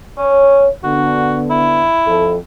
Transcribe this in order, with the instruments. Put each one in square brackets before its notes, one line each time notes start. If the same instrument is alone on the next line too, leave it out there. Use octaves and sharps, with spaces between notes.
[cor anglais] C#4 [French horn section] C#5
[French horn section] D3 B3 [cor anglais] F#4
[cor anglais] E4
[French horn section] F2 A4